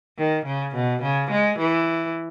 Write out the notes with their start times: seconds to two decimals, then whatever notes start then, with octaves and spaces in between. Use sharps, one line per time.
0.17 D#3
0.45 C#3
0.75 B2
1.02 C#3
1.31 G#3
1.58 E3